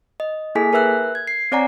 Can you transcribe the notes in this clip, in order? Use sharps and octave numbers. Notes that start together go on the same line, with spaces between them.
D#5
A#3 E4 G#4 A4 G#5 B6
A#4 B4 E5 E6 F#6
G#6
C7
C4 C#5 D5 F#5 G#5 A#5